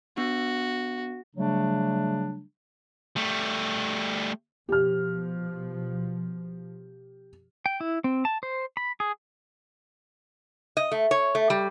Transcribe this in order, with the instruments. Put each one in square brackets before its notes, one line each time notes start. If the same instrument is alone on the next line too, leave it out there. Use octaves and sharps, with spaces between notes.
[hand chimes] B3 D4 [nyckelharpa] F#4
[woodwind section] C#3 F#3 G3 A3 D4
[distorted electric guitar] G3 A3
[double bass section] B2 F3 [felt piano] G4 F6
[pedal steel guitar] G5
E4
C4
A5
C5
B5
G#4
[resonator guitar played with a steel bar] D#5
A3
C#5
A3
G3